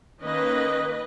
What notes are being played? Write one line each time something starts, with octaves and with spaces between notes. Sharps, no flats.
D#3 A#3 C#4 B4 D#5